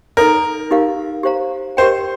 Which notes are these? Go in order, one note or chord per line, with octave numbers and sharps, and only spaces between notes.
D#4 A4 A#4 D5
D#4 G4 A#4 F5
G4 C5 F5 A#5
G4 A#4 C5 D#5 G5